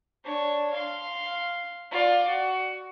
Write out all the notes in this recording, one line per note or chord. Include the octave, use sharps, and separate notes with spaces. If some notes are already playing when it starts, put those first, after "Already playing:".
D4 C#5
F5 C6
F4 D5
F#4